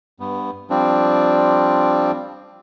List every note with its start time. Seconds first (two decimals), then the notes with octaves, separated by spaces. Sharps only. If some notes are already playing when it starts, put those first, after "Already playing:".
0.20 G2 B3
0.70 F3 G3 C4 D4